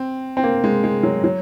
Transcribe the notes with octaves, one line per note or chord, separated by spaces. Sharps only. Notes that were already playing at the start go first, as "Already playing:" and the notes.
Already playing: C4
C4
A#3
G#3
G#3
F#3
F#3